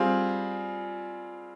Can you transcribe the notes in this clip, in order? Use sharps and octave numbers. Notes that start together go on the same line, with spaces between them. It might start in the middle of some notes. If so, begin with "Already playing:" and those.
Already playing: G3 C4 F4 G#4